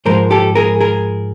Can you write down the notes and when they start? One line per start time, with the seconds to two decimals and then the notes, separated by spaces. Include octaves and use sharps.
0.05 G#2 F3 G#3 A#4 C5
0.31 G4 A4
0.55 G#4 A#4
0.81 G#4 A#4